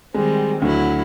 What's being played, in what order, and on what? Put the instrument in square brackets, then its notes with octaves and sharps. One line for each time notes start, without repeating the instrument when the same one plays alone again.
[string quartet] D#3 G3 C4 [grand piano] G#3
[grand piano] D2 [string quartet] F#3 E4